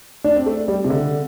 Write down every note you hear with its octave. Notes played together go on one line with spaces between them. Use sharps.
D4
C4
A3
G3
C3
D3